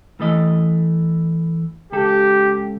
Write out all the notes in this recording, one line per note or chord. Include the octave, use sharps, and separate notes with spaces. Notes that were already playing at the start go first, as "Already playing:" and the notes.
E3 A3 D#5
C#2 G4 A4